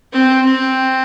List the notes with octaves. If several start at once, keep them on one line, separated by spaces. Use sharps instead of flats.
C4
C4